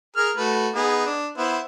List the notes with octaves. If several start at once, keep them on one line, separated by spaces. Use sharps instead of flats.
G#4 A#4 F6
A3 F#4 B4
B3 D#4 G#4
D4
B3 E4 C5